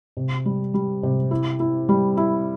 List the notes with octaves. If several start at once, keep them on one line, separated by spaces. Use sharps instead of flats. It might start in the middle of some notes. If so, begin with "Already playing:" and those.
C3
G3
G3
C3
E4
E4
G3
E4